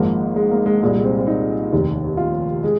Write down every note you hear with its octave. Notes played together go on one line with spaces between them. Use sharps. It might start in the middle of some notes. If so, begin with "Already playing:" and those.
Already playing: G#1 G#2 F3 A#3
G#3
A#3
G#3
C2 A#2 G#3
G#3
C4
C4
D#4
F1 D#2 D#3
F4
G#3 G#4